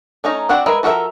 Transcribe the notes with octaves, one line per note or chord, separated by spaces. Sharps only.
A3 C#4 D#4 A#5
C4 D4 F#4 F#5
G#3 A#4 B4 E5 G#5
F3 F#4 A4 A#4 E5